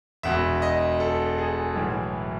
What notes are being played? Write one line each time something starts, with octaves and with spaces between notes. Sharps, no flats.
E1 E2 B2 E5
D#5
A4
G#4
B1 A2 E3